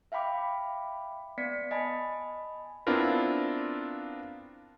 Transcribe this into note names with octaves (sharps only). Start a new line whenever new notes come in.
E5 F5 G5 B5 D6
B3 D5 B6 C#7
D#5 G#5 A5 B5
B3 C4 D4 E4 F4 A#4